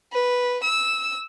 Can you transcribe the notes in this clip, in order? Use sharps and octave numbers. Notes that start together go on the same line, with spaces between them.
B4
E6